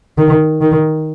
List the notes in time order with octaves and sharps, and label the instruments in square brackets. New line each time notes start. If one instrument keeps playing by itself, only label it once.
[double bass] D#3
D#3